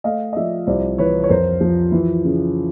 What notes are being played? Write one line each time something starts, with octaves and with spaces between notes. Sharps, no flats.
A3 D#5 F5
D#5
F3 D5 E5
C2 C5 D5
E3 B4 C#5
C#5
F2 A#4 C5
F3
E3
C#3